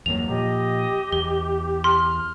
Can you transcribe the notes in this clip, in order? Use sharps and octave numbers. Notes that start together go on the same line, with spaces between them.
E2 G2 F#3 A#3 F7
A#2 F3 G4 D#5
E2 G7
C6 F6